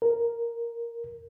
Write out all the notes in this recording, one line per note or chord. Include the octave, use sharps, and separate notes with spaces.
A#4